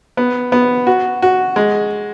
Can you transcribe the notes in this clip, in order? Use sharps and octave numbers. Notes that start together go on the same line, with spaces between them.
B3
B3
F#4
F#4
G#3